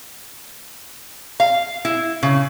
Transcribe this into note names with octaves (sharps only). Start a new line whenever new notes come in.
F5
E4
C#3